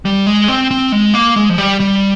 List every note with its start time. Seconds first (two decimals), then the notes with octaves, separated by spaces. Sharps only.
0.05 G3
0.26 G#3
0.48 C4
0.71 C4
0.92 G#3
1.14 A#3
1.36 G#3
1.50 F3
1.58 G3
1.80 G3